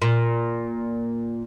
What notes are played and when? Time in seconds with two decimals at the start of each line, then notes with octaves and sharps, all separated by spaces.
0.02 A#2